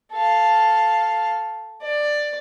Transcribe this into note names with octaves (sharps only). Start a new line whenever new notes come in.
A4 F5
D5